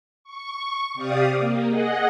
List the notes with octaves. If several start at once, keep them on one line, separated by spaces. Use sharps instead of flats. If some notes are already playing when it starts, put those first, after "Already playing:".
C#6
C3 G4 D5 F5 D#6
A#3
G#4 D#5 F#5